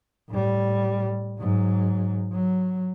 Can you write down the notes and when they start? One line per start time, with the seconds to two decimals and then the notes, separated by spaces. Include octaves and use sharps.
0.28 A2 G3
1.38 G#2 F#3
2.32 F#3